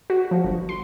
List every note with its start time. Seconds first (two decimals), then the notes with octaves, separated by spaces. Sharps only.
0.10 F#4
0.31 F3
0.44 G1
0.69 C6